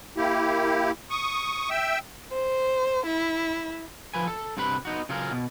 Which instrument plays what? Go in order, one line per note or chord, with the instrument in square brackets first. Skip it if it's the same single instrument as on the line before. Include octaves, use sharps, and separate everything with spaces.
[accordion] A#3 E4 G4
C#6 D#6
E5 G5 E6
[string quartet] C5
E4
[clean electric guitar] F3 B4 G#5
A4
G2 C3 F#4 B4 B5
B3 D#4 F#4
C#3 F#3 F4 G#4 A#4
B2